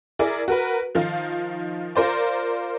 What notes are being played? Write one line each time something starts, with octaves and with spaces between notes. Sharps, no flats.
E4 G#4 A#4 D5
F#4 A#4 B4
D#3 F3 D#4 F5
F4 A#4 C5 D5